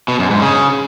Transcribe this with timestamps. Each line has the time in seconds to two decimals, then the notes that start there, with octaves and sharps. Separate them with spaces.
0.08 B2
0.19 F#2
0.31 G#2
0.42 C#3